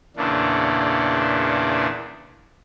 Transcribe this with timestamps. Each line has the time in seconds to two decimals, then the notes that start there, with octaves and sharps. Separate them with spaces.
0.17 E2 A#2 C#3 E3 D4